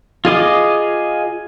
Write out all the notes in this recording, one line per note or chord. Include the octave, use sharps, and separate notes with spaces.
F4 G#4 D#5 D6